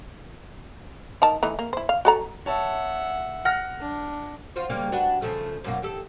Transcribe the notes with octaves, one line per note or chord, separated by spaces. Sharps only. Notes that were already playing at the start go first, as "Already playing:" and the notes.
D#4 A#4 A5
E3 A3 D#4
A#3
E4 C5
F5
F#4 A4 A#5
C#5 E5 F#5 A5
F#5 F6 A#6
D4
F4 F#4 C5
C#3 G3 A#3
D4 F#4 B4
C#3 F3 A3
F#2 B2 A#3
D#2 G4 A4